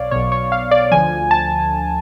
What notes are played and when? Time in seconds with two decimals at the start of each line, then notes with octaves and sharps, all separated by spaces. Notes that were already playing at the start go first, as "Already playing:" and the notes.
Already playing: B1 B2 C#5 D5 F5
0.11 B1 B2 C#5
0.32 C#5
0.52 F5
0.71 D5
0.91 D2 D3 F3 G#5
1.31 A5